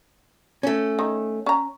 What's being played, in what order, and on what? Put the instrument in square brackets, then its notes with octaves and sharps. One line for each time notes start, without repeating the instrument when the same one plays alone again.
[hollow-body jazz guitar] A3 C#4
[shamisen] D#3
C#4 A#5